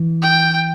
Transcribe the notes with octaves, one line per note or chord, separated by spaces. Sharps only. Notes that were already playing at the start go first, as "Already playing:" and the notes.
Already playing: E3
G5